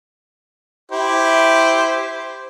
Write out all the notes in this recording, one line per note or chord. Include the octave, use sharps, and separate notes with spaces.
E4 G4 C5